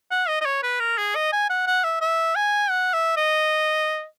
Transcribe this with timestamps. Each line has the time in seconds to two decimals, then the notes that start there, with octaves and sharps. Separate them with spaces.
0.11 F#5
0.28 D#5
0.41 D#5
0.46 C#5
0.63 B4
0.80 A#4
0.98 G#4
1.16 D#5
1.33 G#5
1.50 F#5
1.67 F#5
1.84 E5
2.01 E5
2.36 G#5
2.70 F#5
2.94 E5
3.17 D#5